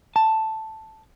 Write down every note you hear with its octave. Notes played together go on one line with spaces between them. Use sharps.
A5